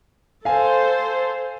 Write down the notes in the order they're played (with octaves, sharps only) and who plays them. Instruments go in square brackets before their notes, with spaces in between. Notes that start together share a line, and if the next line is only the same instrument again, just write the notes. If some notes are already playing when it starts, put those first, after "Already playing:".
[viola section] A4 C5 [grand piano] F5 G#5